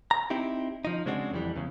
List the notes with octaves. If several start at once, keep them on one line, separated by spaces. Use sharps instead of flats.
A#5
C4 D#4 E4 G4
F3 D#4
C#3 G#3 C4 D4 F#4
F2 E3 G3
E2 C#3